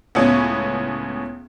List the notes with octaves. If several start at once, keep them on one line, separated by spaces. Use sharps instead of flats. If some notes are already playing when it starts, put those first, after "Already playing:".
C#2 A2 B3 C#4